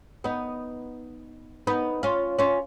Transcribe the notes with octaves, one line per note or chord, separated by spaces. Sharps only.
B3 D#4
B3 D#4
C#4 F4
C#4 F4